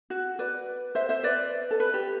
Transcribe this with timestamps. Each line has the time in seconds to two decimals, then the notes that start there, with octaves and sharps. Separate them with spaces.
0.10 F#4
0.39 B4 D5
0.95 C5 E5
1.09 C5 E5
1.23 B4 D5
1.71 A4
1.80 B4
1.94 G4